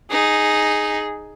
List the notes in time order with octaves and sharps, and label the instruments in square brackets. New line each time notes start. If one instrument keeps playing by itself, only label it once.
[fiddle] D#4 [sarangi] G#4